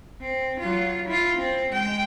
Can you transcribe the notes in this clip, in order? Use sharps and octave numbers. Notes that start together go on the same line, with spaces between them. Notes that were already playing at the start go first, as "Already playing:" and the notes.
C4
F#3 F4
E4 F4
C4
G#3 G5